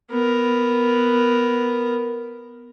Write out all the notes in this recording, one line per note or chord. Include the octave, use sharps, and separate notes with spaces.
B3 A#4